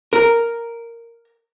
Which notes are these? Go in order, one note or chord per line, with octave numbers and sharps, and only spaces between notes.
A#4